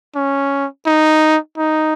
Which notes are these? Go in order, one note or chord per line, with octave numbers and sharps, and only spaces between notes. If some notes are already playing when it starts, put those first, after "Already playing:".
C#4
D#4
D#4